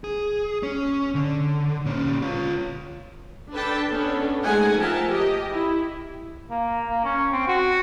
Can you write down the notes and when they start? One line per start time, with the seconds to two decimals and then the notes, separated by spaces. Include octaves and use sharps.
0.04 G#4
0.63 C#4
1.15 D3
1.85 A#2 C#4
2.22 F4 C#5
3.53 D4 A4 B4 G5 A5
3.92 B3 C#4 D4 A4
4.44 G#3 A3 D#4 F#5 G#5
4.79 F3 A#4 E5 G5 A5
5.08 G4 D#5
5.52 E4
6.50 A#3
6.89 A#3
7.04 C#4
7.32 C4
7.48 F#4